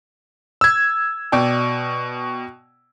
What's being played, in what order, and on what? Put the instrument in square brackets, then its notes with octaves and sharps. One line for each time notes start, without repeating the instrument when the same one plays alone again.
[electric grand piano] E6 G#6
[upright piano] B2 D5 G5